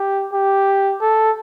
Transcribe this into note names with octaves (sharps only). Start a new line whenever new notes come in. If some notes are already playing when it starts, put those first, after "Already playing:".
Already playing: G4
G4
A4